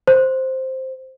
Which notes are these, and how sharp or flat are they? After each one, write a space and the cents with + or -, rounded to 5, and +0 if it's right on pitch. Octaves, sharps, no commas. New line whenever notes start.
C5 +0